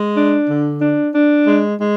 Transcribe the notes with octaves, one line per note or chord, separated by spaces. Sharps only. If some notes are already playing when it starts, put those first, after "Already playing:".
Already playing: G#3
D4
D3
D4
D4
G#3
G#3